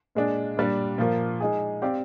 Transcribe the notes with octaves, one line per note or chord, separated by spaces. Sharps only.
A#2 G#3 D4
A#2 G3 D4
A#2 F3 A#3 F4
G#3 D#4 G#4
C4 G4 D5 F5